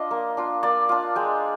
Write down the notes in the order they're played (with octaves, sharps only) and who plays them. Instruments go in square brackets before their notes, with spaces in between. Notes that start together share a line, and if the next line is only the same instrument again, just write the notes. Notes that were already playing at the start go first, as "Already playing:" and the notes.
Already playing: [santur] D4 F4 D#5
A#3
D4 F4
A#3 D5
D4 F4
G#3 G5